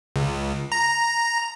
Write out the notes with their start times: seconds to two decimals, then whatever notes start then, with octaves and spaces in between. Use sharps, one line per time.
0.16 C#2
0.72 A#5